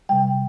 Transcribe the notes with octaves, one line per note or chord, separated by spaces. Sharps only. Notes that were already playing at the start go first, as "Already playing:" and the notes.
C3 G3 G5